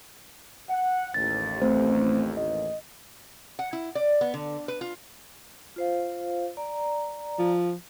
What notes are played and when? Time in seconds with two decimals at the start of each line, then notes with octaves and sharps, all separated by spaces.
0.69 F#5
1.14 A1 D#2 A6
1.62 A3 C4 C5
2.37 D#5
3.59 F#5
3.73 E4
3.95 D5
4.21 B3
4.34 D3
4.68 B4
4.81 F4
5.76 F4 C5 F5
6.57 D5 A#5
7.39 F3